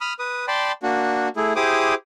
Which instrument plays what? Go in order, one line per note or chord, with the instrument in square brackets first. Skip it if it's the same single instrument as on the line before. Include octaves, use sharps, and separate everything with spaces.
[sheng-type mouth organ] B5 D#6 F6
B4 D#6
D5 G5 A5 B5 C6
A#3 D4 F#4
A3 E4 G#4
E4 G4 G#4 C5 D6 D#6